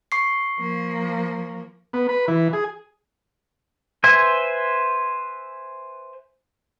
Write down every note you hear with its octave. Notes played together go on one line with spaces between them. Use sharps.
C#6 C7
F3 A#3
B3
B4
E3
G#4
B4 C5 E5 G#5